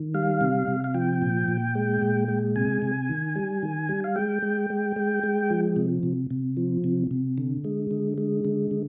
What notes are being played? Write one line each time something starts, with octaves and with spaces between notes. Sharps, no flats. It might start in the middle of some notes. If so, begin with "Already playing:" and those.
Already playing: D#3
G3 F5
C3
C3
F5
F3 G5
A#2
A#2
G#3
A#2
G#3
C3 G#5
C3
D#3
G3
D#3
G3
F5
G#3 G5
G#3
G#3
G#3
G#3
F3
C3
C3
C3
F3
C3
C3
D3
G#3
D3
G#3
D3
D3